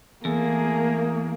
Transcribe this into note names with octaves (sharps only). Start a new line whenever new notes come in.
E2 A3 A#3 G#4